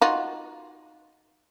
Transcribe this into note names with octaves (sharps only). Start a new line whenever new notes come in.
D#4 F4 F#4